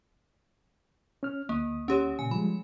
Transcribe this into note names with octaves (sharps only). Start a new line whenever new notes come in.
C#4 F6
D2 A#3 D#6
C#4 G4 C#5
A#2 C#3 G#5
F3 G3 G#3 B5